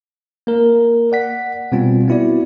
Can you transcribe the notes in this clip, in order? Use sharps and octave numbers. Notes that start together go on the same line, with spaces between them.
A#3 A#4
D5 F#5 B6
B2 G3 B3 C4 F4
B3 C4 E4 F#4 D5